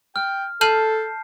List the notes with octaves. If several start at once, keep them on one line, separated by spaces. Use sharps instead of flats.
G5 F6
A4 A5 F6 G6 C7 D#7 F#7